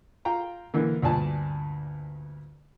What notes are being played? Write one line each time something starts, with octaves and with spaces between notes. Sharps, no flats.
F4 F5 G5 A#5
D3 E3 A#3
D2 G2 A#2 D5 G#5 A5